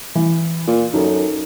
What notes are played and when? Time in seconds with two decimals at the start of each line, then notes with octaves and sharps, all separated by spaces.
0.15 E3
0.67 A#2
0.94 F#2 D#4 A4